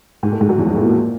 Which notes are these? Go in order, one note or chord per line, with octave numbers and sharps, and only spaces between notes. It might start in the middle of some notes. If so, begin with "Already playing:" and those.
G#2 G#3
A2 A3
G#2 G#3
F#2 F#3
E2 E3
F2 F3
A2 A3
A#2 A#3